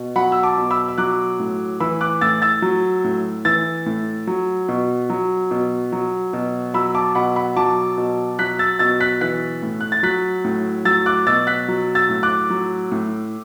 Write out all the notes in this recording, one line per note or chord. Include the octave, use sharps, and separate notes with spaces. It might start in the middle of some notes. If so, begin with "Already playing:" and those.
Already playing: B2
F#3 F#5 B5
E6
A5 D6
B2
B5 E6
E6
F#3 D6 F#6
A2
E3 B5 E6
D6 F#6
A2 E6 A6
E6 A6
F#3
A2
E3 E6 A6
A2
F#3
B2
F#3
B2
F#3
B2
F#3 B5 E6
A5 D6
B2 F#5 B5
F#5 B5
F#3 A5 D6
B2
F#3 F#6 B6
E6 A6
B2 E6 A6
F#6 B6
E3 F#6 B6
A2
F#6
A6
F#3 F#6 B6
A2
F#3 E6 A6
D6 F#6
B2 E6 A6
F#6 B6
F#3
E6 A6
A2
D6 F#6
F#3
A2